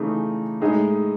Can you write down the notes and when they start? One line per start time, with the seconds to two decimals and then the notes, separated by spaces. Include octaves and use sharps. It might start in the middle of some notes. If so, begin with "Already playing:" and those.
Already playing: C#3 E3 A3 D#4 G#4
0.61 A2 G#3 D#4 G#4